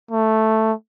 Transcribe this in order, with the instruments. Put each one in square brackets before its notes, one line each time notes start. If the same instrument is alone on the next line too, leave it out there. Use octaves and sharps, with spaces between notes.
[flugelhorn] A3